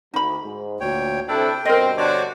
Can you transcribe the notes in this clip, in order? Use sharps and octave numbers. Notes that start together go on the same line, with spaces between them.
D2 D#4 B5
G#2
D2 A#2 F#4 C#5 G5
C3 C4 D4 E4 A4 G5
G2 B2 C4 A#4 D#5
D3 D4 F#4 C5 C#5 D6